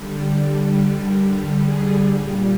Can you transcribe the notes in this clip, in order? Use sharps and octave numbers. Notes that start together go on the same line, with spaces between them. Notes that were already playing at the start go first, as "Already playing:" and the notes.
Already playing: D3 G3
A#4
G4
G#4
A#2 G3